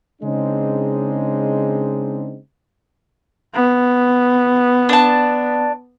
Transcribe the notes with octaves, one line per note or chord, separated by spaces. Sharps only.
C#3 G#3 C4 D4 D#4
B3
D4 A5